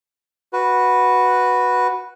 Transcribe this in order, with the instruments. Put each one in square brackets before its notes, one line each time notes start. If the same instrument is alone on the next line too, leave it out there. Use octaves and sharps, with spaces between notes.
[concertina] F#4 B4